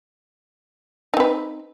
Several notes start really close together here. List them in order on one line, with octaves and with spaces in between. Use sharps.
D#4 C4 B4